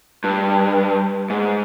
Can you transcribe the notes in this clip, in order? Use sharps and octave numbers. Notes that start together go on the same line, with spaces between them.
G2
G#2